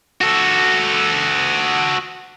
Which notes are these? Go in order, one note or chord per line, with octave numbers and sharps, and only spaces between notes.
F#4 A4